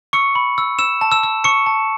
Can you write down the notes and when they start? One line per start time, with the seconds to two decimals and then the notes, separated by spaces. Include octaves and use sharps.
0.13 C#6 E6 C#7
0.35 B5
0.58 E6
0.79 E6 E7
1.01 A5
1.12 E6 E7
1.23 E6
1.44 C#6 E6 C#7
1.66 A5